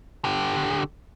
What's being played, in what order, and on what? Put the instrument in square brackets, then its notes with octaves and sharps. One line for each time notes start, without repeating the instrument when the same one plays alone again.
[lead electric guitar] D3 G4